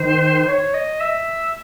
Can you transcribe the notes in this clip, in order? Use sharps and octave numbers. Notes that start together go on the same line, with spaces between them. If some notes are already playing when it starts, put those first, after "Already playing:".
Already playing: D#3 C5
C#5
D#5
E5